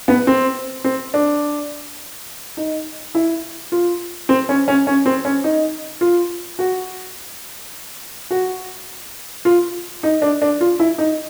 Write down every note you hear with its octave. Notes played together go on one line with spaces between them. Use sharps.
B3
C4
C4
D4
D#4
E4
F4
C4
C#4
C#4
C#4
C4
C#4
D#4
F4
F#4
F#4
F4
D#4
D4
D4
F4
E4
D#4